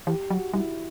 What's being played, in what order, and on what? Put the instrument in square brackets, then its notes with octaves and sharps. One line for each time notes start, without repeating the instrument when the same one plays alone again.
[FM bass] E3 [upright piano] G4
[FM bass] F#3 [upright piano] F#4
[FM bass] G3 [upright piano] E4